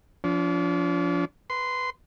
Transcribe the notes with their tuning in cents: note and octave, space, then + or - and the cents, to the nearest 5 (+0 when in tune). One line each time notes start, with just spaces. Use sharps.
F3 +0 D4 -40
B4 +0 C6 -15